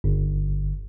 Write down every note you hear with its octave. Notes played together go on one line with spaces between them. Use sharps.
G1